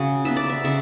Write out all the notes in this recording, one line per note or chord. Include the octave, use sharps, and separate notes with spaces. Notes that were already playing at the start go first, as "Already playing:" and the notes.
Already playing: C#3 F#4 G#4
F#3 B3 E5
D5
E5
C#3 E5